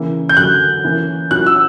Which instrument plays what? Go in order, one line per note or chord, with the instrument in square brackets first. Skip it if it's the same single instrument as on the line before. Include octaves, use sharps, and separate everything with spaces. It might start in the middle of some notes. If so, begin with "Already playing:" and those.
Already playing: [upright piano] C#3 E3 A#3 E4
[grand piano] G6
[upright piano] F#2 D3 F#3 [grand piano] F#6
[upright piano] E3 A#3 C#4 E4
[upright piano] A#2 F#3 C#4 E4 [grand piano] F#6
[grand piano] E6